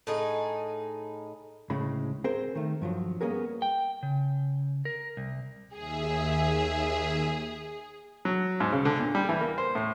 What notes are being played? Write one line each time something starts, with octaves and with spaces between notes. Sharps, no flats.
A2 D#4 G#4
D2 A2 C#3 G#3 B5
C4 G#4 A#4 C5
D#3 A3
G2 F3 F#3
G3 A#3 B3 C#4 G#4 A#4
G5
C#3
A#4
C2
D#2 G#4 E5
F#3
G#2
C#3
D3
A#2
G3
E3
A#3
C5
A2